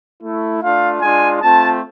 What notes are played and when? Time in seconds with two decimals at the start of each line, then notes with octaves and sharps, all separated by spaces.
0.22 A3 E4
0.62 A3 D4 F4 F5
1.01 G#3 D4 F4 G#5
1.40 A3 C4 F4 A5